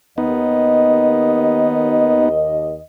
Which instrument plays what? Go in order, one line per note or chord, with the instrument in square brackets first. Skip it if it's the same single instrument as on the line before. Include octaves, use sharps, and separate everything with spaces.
[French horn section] D#2 D#5 [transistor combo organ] B3 D#4